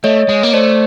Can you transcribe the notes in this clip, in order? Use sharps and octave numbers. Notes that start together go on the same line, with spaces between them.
A3 C#5 D#5
G#3
A#3
A3 C5 D5